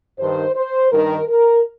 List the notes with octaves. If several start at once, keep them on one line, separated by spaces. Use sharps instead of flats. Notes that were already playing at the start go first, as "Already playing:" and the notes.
G2 D#3 C5
C5
G2 D#3 A#4
A#4